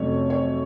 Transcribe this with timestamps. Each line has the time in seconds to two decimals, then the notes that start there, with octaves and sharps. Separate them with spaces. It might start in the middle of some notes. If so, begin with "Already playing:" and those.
Already playing: F2 C3 F#3 A3 C#4 C#5
0.30 C#5